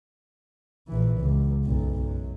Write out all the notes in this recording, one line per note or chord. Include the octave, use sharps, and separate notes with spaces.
A#1 E3
C#2
B1 F#2
F#2